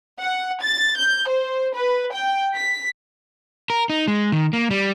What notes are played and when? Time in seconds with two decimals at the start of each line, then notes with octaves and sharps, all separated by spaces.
0.19 F#5
0.61 A6
0.98 G6
1.28 C5
1.73 B4
2.11 G5
2.55 B6
3.70 A#4
3.90 D#4
4.08 G#3
4.32 D#3
4.53 A#3
4.71 G3